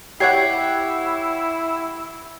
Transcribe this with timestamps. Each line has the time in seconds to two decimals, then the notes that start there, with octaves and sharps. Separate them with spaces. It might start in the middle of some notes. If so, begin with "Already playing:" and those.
0.20 E4 G4 C#5 F#5 G#6 C7